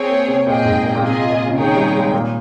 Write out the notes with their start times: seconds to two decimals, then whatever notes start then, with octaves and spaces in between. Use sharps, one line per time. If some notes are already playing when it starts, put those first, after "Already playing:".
Already playing: C4 G#4 C#5 G5
0.10 A#3
0.28 C3
0.47 A#2 G#4 D#5 G5
0.65 G#2
0.84 A#2
0.95 A#2
1.02 C3 F4 G#4 D#5 G#5
1.30 A#2
1.48 C#3
1.57 D#3 D#4 G#4 C#5 G5
1.76 G3
1.94 G#3
2.13 A#2